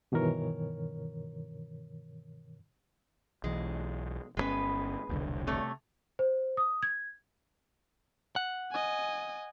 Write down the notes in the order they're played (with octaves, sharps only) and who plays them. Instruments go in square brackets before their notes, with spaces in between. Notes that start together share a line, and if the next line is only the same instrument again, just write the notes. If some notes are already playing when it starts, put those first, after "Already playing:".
[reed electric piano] G2 B2 D#3 E3 A#4 C#5
[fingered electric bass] B1 E3 [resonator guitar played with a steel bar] G#3
[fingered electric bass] G1 C#3 C#4 [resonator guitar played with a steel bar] G#3 B3 B4
[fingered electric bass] E1 C2 D3
[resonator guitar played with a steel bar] C3 A3 C#5
[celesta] C5
D#6
G#6
[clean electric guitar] F#5
[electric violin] D#5 G#5